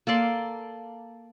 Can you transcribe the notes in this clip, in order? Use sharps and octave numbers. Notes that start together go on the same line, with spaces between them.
A#3 A4 D5 C6